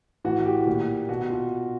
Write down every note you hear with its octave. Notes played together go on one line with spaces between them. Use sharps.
A2 E3 F#4
G4
A#2
B2 F#4
F4